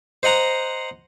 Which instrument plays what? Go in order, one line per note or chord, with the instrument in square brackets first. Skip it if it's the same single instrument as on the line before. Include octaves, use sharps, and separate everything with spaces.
[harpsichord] C5 D#5 F#5 A#5